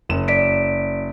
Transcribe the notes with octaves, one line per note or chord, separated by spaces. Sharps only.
F#1 E7
D5 B6 D7